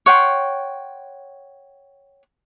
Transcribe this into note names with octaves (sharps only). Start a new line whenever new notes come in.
C#5 F#5 G5 C6